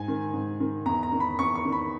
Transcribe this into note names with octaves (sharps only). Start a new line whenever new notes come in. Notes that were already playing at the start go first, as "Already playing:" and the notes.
Already playing: G#2 G#5
D#3
G#2
D#3
E2 A#5
A#5
D#3
B5
E2 C#6
C#6
D#3
B5